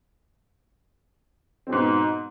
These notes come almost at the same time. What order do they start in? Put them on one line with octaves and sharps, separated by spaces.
C4 B2 G#2 B3